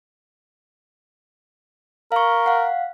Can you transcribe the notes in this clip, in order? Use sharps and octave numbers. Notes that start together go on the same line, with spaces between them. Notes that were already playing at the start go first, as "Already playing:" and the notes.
A#4 F5 C#6
F5 F#5